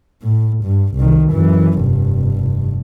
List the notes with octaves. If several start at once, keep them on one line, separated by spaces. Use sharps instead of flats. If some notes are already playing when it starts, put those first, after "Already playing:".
A2
G2
C2 D#3
F#2 E3
F1 G2